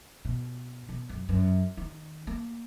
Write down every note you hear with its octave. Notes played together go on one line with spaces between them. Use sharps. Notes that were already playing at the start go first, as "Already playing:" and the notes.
B2
B2
F#2
F#2
D#3
A#3